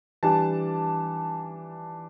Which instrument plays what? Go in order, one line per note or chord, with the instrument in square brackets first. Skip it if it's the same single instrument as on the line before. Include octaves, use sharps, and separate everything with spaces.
[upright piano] E3 G3 D4 A5